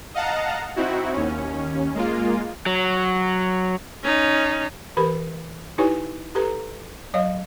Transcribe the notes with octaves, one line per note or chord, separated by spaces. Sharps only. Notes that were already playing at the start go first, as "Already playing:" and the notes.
D#5 F5 F#5 A5 A#5
C4 D#4 E4 F#4
D#2 C#4
G#3 A#3 F4
F#3
C#4 D#4
E3 G4 A#4 B4 B5
D#4 E4 G4 B4 C#5 G#5
G4 A4 B4 A#5
F#3 C#5 D#5 F5